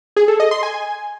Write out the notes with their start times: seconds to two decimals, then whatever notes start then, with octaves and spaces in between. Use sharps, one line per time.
0.16 G#4
0.28 A4
0.40 D#5
0.51 C6
0.63 G#5